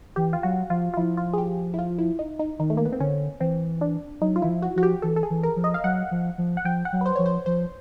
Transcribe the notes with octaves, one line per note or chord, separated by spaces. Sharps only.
E3 G4
F4
F#3 F#4
F3 F4
F4
F3 E4
F4
G#4
G4
E4
F4
E4
D#4
D#4
D#3 D#4
A3
A#3
B3
C4
D3 C#4
E3 C4
D4
F#3 D#4
F4
E3 E4
F3
F#4
F3 F#4
G4
E3 A4
A4
G#4
E3
A#4
F3
D#5
F5
F#3 F#5
F3
F3
F#5
F3 G5
F#5
F#3
B4
C5
F3 C#5
C5
F3 C5